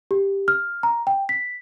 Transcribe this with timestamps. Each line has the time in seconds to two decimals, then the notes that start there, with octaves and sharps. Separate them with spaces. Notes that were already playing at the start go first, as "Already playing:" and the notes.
0.11 G4
0.48 F6
0.83 A#5
1.07 G5
1.29 B6